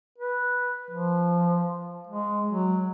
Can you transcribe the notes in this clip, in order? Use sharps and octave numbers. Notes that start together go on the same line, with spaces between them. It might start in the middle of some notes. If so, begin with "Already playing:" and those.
B4
F3
G#3
F#3